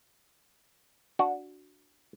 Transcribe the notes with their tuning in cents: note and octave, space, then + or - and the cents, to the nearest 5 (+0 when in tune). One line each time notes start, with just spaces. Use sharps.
D4 -5 F#4 -10